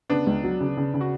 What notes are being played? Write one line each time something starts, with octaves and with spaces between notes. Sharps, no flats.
C#3 B3 D4
C#2
F#3
C#3
C#3
C#3
F#4